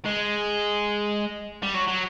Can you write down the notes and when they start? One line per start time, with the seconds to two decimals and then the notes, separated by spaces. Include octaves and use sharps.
0.05 G#3
1.63 G3
1.74 F#3
1.88 F#3